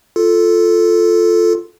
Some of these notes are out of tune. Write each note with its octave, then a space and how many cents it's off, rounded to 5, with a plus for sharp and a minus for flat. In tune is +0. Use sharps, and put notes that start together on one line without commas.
F4 +0 A4 +0